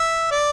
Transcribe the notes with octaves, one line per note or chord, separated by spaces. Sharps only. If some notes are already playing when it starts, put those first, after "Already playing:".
Already playing: E5
D5